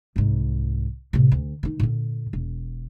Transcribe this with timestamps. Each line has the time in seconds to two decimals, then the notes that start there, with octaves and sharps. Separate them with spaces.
0.16 C2 G#2
1.13 A2 C3
1.32 D2
1.63 D#3 D#4
1.80 A#2 D3
2.33 E1